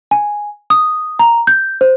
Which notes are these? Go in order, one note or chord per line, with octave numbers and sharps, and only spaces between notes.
G#5
D#6
A#5
G6
C5